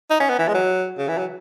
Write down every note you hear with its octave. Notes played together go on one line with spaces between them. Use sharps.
D#4
C#4
B3
E3
G#3
F#3
C#3
E3
F#3